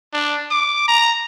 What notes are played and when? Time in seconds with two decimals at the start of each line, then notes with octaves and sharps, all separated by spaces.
0.13 D4
0.51 D6
0.88 A#5